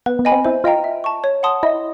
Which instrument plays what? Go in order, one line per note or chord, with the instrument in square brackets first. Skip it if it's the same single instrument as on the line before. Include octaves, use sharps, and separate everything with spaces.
[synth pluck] B3 [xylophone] B4
[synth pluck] B3
[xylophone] D#5 G#5 B5
[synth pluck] C4
[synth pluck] E4 [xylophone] C5
[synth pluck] F4 [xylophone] D#5 G5 A#5
[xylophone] E5
A5 C#6
C#5
F#5 A5 C6 D#6
[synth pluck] E4 [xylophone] D#5